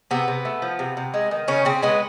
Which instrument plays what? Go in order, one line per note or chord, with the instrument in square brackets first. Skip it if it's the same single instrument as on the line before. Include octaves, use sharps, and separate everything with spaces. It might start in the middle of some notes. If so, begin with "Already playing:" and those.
[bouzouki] C3 B3
C3
A3
F3
C3
C3
G#3
D#3
C#3 C#4
C#3 C4
G#3 B3